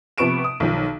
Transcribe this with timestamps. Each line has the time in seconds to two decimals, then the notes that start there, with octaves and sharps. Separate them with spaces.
0.18 C3 F3 B3 C#6 D7 E7
0.44 D#6
0.60 B1 D#3 F3